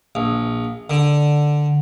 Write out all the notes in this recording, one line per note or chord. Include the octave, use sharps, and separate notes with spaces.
A#1
D3